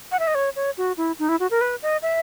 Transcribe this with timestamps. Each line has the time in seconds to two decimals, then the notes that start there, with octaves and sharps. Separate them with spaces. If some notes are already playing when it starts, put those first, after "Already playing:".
0.12 F#5
0.19 E5
0.27 D#5
0.35 C#5
0.56 C#5
0.78 F#4
0.97 E4
1.19 D#4
1.29 E4
1.40 F#4
1.51 A#4
1.61 B4
1.82 D#5
2.02 E5